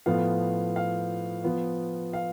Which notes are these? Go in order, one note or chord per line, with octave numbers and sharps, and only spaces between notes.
A2 F3 B3 F5
F5
F3 B3
F5